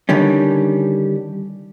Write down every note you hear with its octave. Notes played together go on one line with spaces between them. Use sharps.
D3 D#3 G3 C#4